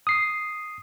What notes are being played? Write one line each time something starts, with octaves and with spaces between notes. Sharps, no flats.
D#6 C7